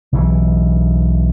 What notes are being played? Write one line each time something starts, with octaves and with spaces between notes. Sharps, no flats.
B1 C#3 E3